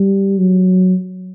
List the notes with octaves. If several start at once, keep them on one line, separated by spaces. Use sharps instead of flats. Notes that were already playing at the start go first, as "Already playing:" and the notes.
Already playing: G3
F#3